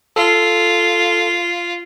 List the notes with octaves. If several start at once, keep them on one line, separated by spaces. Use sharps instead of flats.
F4 A4